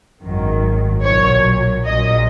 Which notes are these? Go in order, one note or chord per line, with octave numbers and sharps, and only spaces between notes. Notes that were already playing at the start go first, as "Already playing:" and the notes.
G#1 F#2 D#3 F#3
B1 A#2 F#3 C#5
A#1 A#2 F#3 D#5